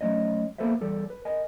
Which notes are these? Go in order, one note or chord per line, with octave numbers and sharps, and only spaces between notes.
F#3 A3 C#4 C#5 D#5
A#3 B3 A4 B4 C5 E5
E2 G3 A4
B4
A#4 D#5 G#5